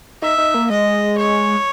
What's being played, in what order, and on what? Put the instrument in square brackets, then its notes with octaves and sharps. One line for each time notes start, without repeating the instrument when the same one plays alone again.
[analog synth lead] D#4 [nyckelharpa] E5
[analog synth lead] D#4
A#3
[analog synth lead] G#3 [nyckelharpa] D#5
[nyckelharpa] C#5